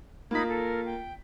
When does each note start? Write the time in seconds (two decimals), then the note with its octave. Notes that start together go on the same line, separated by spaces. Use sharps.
0.31 A#3 D#4 F4 B5 G#6 B6
0.49 A4 A#4
0.85 G5